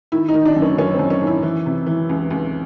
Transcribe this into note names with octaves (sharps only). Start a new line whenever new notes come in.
D#3 E4
D#4
D#3
D4
F#2
C#4
F#2 C#4
C4
F#2
C#4
D#3
E4
E3
C3
E3
C#2
C#2